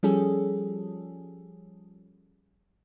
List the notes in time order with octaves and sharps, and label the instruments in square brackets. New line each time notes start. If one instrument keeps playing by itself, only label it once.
[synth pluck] F3 G3 C#4 G#4 A4